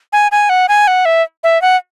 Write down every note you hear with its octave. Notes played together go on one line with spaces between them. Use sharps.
G#5
G#5
F#5
G#5
F#5
E5
E5
F#5